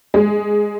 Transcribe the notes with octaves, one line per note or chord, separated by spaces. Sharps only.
G#3